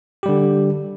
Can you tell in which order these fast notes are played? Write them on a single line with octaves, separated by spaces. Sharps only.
G4 G3 D3